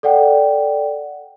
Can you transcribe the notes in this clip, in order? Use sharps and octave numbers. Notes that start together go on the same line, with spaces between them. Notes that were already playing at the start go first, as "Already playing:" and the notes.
A4 D5 F#5 G5